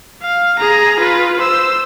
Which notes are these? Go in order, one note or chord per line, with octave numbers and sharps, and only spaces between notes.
F5
G#4 A#5
F4 B4
C5 E6